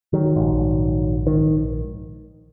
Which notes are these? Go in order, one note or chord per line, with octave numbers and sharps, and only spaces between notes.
D#3 F#3
A#1 G#2
D#3